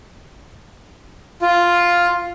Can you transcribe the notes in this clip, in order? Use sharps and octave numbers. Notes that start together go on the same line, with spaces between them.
F4